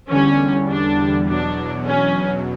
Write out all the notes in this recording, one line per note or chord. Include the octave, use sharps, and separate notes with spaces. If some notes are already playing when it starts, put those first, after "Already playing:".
E2 D3 G3 C#4
D4
E2 B2 F#3 D4
C#4